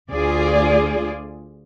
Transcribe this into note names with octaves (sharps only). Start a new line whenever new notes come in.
D2 F4 G#4 D5